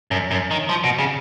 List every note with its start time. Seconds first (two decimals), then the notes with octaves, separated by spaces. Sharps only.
0.11 F#2
0.31 F#2
0.51 D#3
0.69 F3
0.84 B2
0.99 C#3